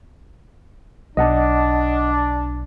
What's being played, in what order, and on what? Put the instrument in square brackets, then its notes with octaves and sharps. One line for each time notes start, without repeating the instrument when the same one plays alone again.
[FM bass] B1 [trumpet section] D4 [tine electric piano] D#5 F#5 A5